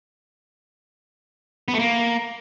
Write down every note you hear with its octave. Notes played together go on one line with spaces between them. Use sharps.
B3
A3
A#3